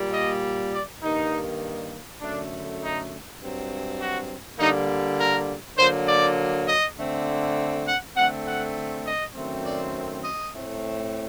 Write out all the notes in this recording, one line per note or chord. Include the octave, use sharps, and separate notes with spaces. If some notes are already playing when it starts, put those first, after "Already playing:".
Already playing: A#2 G3 A#3
D#5
D5
G2 D#3 G3 A#3 D#4
F#2 D3 A3 D4
D#4
G2 F#3 C4
F#4
D3 G3 A#3 D#4
A#4
D3 F#3 A#3 C5
D5
D#5
D3 A3 C4
F#5
D3 A3 C4 F#5
F#5
D#5
F#2 D#3 A3 C4
D5
D#5
A2 A3 C4